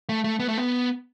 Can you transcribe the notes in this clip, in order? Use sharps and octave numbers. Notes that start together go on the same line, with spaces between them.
A3
A3
B3
A3
B3